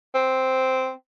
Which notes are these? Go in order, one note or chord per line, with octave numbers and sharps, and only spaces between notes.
C4